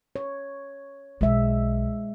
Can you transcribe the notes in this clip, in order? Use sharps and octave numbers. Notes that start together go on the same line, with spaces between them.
C#5
B1 G#3 E5